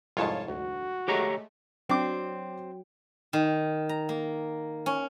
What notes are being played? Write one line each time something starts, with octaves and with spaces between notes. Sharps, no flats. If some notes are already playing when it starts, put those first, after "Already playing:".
C2 F2 G#2 F4 C#5 A5
D2 F#4
G#3 A3 G4 C#5 A#5
F#3 C4 D4 D6
D#3
A#5
A#3
C#4